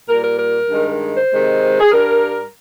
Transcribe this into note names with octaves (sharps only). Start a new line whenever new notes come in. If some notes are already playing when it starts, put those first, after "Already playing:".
A#2 G3 A#4
A#4
A#4
G2 D#3 G#3
C5
C3 D#3 G#3
G#4
G2 G3 A#4